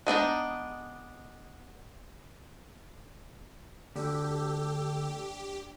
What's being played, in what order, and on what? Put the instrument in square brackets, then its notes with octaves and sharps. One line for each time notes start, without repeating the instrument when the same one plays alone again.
[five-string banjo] G#3 B3 D4 D#4
[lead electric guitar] D2 [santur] D4 D5 [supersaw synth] G4 [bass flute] A4